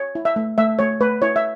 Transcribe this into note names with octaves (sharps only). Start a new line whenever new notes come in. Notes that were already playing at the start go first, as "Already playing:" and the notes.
Already playing: C#5
E4
E5
A3
A3 E5
A3 C#5
A3 B4
E4 C#5
E5